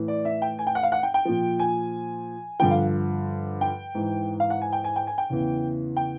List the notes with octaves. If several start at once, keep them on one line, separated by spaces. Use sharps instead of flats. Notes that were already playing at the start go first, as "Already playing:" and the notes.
Already playing: A2 E3
D5
E5
G5
G#5
G5
F#5
F5
F#5
G5
G5
A#2 F3
G#5
G2 D3 F3 G5
F5
G5
G#2 E3
F5
F#5
G#5
G5
G#5
G5
G#5
G5
E2 C#3 E3
G5